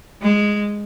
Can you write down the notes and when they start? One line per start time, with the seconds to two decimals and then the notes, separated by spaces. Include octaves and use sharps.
0.22 G#3